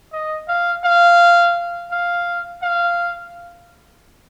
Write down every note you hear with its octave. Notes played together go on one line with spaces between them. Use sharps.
D#5
F5
F5
F5
F5